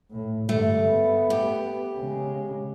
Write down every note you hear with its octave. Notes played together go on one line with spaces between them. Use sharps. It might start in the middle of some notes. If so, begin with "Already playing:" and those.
A2
G2 D3 A3
B3
G4
C#3 G#3